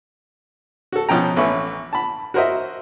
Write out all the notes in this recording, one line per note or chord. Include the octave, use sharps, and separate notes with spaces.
F#4 A4
B2 F3 C#4 G5 A#5
A1 A3 C#4 B4 E5 C#6
A5 B5
F#4 A#4 C5 D#5 E5